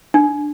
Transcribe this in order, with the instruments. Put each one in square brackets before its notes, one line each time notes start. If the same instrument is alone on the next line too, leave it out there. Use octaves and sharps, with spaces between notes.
[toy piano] D4